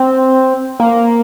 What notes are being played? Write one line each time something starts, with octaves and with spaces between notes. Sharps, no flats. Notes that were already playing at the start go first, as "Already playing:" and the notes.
Already playing: C4
A#3